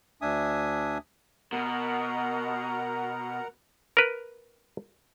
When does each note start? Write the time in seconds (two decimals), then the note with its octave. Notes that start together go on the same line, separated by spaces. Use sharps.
0.22 D2 D4 E5 G#5 D#6
1.53 B2 A#4 F#5 A#5
3.97 A#4 B4